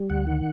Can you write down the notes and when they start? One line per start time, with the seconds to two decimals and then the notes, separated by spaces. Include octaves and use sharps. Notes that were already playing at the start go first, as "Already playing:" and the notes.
Already playing: G3
0.10 D2 F#5
0.27 D#3